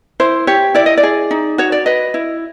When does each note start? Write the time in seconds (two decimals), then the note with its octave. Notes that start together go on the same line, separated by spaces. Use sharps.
0.20 E4 C5
0.47 G4 C#5
0.74 E4 D5
0.86 D#5
0.97 D5
1.03 G#4
1.31 D#4
1.58 F#4 C#5
1.72 D5
1.86 B4 D#5
2.14 E4